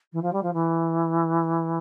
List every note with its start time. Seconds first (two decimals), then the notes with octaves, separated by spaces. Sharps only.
0.13 E3
0.22 F3
0.33 G3
0.43 F3
0.53 E3